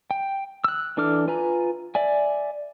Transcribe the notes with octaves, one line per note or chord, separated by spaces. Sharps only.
G5
E6 F#6
E3 D4 A4 D6 F6
F4 B4 G#5 A#5
D5 E5 G#5